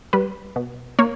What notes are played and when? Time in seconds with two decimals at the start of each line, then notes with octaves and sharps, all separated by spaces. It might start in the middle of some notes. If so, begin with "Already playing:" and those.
0.13 G3 B4
0.56 B2
0.99 A#3 C#5